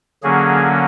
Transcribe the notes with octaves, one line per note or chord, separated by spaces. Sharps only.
D3 F#3 A#3 C#4 G#4